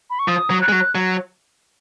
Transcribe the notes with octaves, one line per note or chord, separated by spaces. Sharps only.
B5
C#6
F3 D#6
F#3
F#6
G#3
F#3
F#3